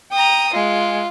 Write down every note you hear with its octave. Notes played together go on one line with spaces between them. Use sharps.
G5 A#5 D#6
G#3 F4